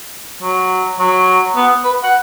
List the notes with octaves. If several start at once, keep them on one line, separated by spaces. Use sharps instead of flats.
F#3
F#3
B3
B4
F#5